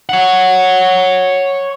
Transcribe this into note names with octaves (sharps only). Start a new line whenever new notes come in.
C#5 F#5